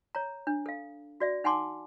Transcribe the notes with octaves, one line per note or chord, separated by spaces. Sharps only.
C#5 A#5
D4
A4 F5
F#4 D5 E5
D#4 F#5 G#5 A5 C6 D6